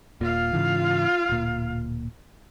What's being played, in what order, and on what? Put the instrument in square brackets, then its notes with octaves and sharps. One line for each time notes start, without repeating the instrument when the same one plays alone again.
[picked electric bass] D#1 A#2 [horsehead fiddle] F4 F5
[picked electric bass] G#2 C#3 E3
D1 A#2